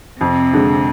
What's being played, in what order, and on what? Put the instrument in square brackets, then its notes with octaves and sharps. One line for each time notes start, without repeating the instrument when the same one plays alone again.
[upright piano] F2 [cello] C3
[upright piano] D3 G#3